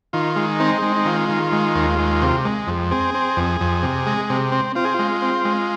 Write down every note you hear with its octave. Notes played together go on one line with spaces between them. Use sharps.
D#3 F4
G#3
C4 D#4
G#3
D#4
D#3 F4
D#3
G#3
D#2
G#3
C3
G#3
F2
C4 G#4
C4
F2
F2
C3
G#3
C3
C4
C4 F4
G#4
G#3 F4
C4
G#3